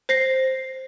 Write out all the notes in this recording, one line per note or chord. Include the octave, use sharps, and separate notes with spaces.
C5 A#6 C7